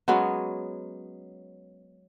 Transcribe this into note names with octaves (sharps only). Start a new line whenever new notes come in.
F#3 G#3 B3 C#4